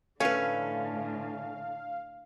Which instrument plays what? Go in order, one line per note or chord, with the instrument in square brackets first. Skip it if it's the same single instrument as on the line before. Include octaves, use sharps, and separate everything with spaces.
[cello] A2 D3 [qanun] A3 B4 [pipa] C#4 [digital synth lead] F5